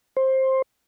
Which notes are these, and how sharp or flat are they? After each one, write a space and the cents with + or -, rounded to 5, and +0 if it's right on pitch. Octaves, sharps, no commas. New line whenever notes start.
C5 +15